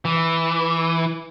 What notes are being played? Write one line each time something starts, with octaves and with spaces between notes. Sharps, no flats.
E3